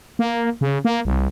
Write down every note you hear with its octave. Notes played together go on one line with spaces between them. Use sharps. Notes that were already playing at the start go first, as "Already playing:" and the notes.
A#3
C#3
A#3
C2